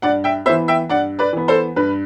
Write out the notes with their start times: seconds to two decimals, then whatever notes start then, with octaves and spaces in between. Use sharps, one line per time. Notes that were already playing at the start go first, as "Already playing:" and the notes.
0.02 G2 D5 F#5
0.24 E5 G5
0.46 B3 C5 E5
0.49 E3
0.68 E5 G5
0.89 G2 D5 F#5
1.19 B4 D5
1.33 E3 B3
1.48 A4 C5
1.76 G2 B4